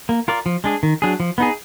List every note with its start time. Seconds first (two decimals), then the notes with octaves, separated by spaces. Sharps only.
0.09 A#3
0.28 F4 A#4 D5
0.46 F3
0.64 G#3 D4 G#4
0.83 D#3
1.02 F#3 D4 G#4
1.20 F3
1.38 B3 D#4 G#4